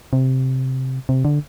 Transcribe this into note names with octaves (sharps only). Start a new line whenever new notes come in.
C3
C3
D3